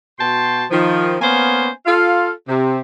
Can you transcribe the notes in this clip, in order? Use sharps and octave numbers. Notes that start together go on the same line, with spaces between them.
B2 F#4 G5 A5 C6
D#3 F3
A#3 B3 C#4 C5 F5 G#5
F4 A4 F5
C3